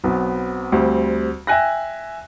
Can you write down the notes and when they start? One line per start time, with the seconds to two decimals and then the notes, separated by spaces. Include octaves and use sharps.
0.04 B1 B3 C4
0.72 D2 G3 C4
1.47 E5 G5 G#5 F#6 A#6